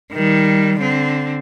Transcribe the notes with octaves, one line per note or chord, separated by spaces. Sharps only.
D#3 G3
D3 C4